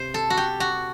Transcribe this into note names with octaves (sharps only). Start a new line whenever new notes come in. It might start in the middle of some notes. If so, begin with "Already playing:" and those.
Already playing: C3 C5
A4
F#4
G4
F#4